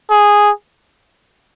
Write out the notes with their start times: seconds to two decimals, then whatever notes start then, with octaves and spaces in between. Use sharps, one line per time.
0.11 G#4